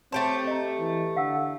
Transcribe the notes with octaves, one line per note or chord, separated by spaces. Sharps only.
A3 C4 G4 C#5 A5 C6
D#5 A#5
E3
D3 F5 F#5 E6